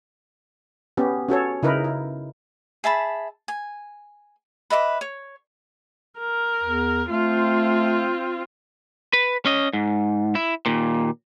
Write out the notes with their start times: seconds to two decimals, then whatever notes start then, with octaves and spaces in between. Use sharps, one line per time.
0.97 B3 C#4 G4
1.29 C#4 F#4 A4 C#5
1.63 C#3 D#4 E4 A#4 B4
1.84 E4
2.84 G#4 E5 A5 B5
3.48 G#5
4.70 B4 D#5 E5 D6
5.01 C#5
6.19 A#4
6.63 E2
7.09 A3 C4 F4
9.13 B4
9.46 C#4 D#5
9.73 G#2
10.35 E4
10.66 D#2 A#2